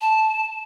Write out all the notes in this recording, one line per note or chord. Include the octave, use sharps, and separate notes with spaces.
A5